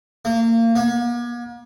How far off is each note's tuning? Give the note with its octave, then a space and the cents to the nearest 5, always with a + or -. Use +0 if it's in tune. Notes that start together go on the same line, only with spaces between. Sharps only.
A#3 -30
A#3 +45